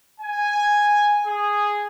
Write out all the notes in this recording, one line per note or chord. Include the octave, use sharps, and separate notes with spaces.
G#5
G#4